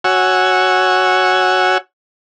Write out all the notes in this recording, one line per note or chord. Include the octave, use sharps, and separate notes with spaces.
F#4 C#5 F#5 G#5 E6